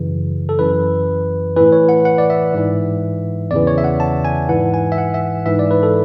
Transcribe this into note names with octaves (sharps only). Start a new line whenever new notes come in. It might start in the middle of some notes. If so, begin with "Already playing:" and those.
Already playing: F#2 C#3 E3
A4
F#2 E3 B4
A2 E3 B4
C#5
F#5
F#5
D5
E5
G#2 E3
E2 C#3 E3 D5
C#5
E5
F#5
A5
G#5
G#2 E3 F#5
G#5
E5
F#5
E5
G#2 E3 E5
D5
B4
A4